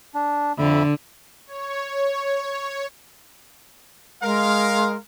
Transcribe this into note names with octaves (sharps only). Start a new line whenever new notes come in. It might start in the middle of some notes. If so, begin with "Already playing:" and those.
D4
F2 D3 E5 B5
C#5
G#3 A#4 F5